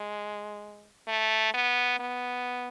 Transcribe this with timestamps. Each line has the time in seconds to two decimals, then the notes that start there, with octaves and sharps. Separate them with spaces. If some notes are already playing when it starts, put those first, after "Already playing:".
Already playing: G#3
1.08 A3
1.54 B3
2.00 B3